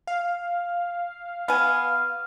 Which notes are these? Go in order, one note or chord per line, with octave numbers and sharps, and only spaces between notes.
F5
B3 G#5 F6